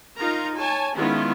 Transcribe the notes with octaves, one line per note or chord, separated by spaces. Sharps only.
D#4 F4 A#4 A#5
C#5 G#5 A5
D#3 G#3 B3 C#4 E4 F4